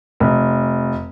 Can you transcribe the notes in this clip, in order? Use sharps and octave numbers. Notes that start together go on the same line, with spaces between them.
F1